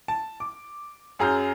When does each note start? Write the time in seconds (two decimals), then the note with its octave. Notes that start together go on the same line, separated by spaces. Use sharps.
0.08 A5
0.40 D6
1.19 F#2 G#4 A#5 F6 G6